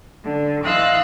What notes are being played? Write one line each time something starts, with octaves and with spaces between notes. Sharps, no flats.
D3
E3 D#5 F5 C6 E6 F#6